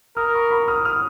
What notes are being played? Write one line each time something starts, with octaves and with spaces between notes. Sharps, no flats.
A#4 D#6 F6
B5 C#6
B5 C#6
D#6 F6
D#6 F6